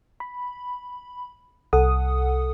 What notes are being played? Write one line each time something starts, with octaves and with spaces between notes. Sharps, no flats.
B5
C2 A4 F#5 D#6